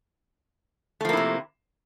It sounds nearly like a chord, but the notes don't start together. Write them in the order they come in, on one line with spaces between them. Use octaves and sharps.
A3 F3 A#3 E4 C3